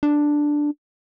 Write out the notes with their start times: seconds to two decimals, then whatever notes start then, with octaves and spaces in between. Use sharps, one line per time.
0.03 D4